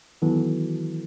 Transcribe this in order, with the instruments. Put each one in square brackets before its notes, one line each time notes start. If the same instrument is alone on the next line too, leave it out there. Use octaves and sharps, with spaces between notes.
[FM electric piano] D#3 F#3 B3 F#4 A4 [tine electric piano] E3